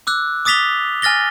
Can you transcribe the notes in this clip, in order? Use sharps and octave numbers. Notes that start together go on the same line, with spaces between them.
D6 E6 F#6
D6 D#6 A6 B6 F7 G7
G#5 F6 A6 A#6 G7